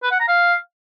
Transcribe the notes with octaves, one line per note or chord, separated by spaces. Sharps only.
B4
F#5
A#5
F5